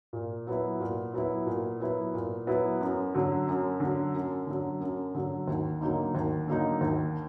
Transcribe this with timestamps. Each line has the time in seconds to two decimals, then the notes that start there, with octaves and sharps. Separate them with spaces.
0.13 A#2
0.47 F#3 B3 E4
0.80 A#2
1.13 F#3 B3 E4
1.46 A#2
1.80 F#3 B3 E4
2.14 A#2
2.47 F#3 B3 E4
2.80 F#2
3.14 D3 F#3
3.48 F#2
3.80 D3 F#3
4.14 F#2
4.47 D3 F#3
4.80 F#2
5.15 D3 F#3
5.48 D#2
5.81 D3 F#3 A#3 D#4
6.15 D#2
6.48 D3 F#3 A#3 D#4
6.81 D#2